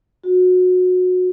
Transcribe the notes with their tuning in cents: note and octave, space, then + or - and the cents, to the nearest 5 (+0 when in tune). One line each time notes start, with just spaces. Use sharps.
F#4 -20